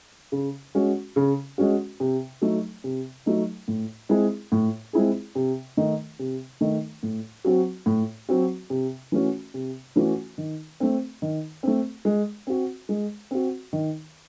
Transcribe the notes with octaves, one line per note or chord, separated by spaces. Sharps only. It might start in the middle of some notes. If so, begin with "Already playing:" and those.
C#3
G#3 C#4 F#4
C#3
G#3 C#4 F#4
C3
F#3 A3 D#4
C3
F#3 A3 D#4
A2
G#3 C4 E4 G#4
A2
G#3 C4 E4 G#4
C3
D#3 A3 D#4
C3
D#3 A3 D#4
A2
F#3 C4 F#4
A2
F#3 C4 F#4
C3
E3 A3 C#4 F#4
C3
E3 A3 C#4 F#4
D#3
A3 C4
D#3
A3 C4
G#3
C4 F#4
G#3
C4 F#4
D#3